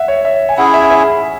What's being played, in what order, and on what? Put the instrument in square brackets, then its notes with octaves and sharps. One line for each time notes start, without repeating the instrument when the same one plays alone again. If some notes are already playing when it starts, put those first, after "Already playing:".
Already playing: [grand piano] E5 F#5
C#5
E5
G#5
[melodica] C#4 E4 G#4 [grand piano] F#5
[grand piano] E5
E5